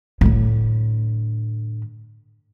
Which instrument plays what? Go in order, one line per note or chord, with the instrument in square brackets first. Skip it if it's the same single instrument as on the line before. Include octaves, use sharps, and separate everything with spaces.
[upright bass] A2 D3